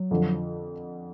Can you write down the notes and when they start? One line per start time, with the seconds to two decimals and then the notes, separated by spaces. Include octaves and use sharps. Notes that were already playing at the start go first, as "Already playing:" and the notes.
Already playing: F#3
0.11 F2 D3 F3